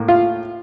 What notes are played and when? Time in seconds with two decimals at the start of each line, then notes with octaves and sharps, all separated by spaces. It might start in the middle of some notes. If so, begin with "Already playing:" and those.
Already playing: A2 A#3
0.08 F4